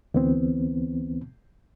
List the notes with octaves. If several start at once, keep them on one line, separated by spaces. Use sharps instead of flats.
D2 E3 B3 C4